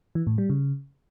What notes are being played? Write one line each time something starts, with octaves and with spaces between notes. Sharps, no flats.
E3
A2
G3
C#3